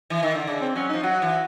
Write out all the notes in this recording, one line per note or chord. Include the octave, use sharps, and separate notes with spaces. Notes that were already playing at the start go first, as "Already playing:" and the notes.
E3
D#3
D3
C#3 D4
C4
F#3 C#4
F3 D#4
F#3 F#4
E3